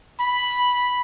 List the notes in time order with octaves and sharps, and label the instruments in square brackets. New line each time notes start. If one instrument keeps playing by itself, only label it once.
[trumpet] B5